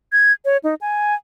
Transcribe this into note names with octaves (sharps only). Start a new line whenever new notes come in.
G#6
C#5
D#4
G#5